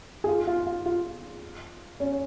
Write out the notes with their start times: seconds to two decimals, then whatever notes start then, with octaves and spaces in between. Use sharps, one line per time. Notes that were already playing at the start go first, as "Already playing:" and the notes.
0.24 G#4
0.28 F4
0.47 F4
0.67 F4
0.86 F4
2.00 C#4